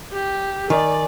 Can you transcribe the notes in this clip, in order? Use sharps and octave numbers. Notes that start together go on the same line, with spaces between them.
G4
D#3 D5 G#5